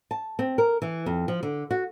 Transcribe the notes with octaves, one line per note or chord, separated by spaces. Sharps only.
A5
C4
A#4
E3
F2
F3
D3
F#4